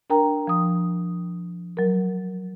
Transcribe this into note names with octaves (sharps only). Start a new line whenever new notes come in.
D4 A#4 G5 A#5
F3 D#6
F#3 A#4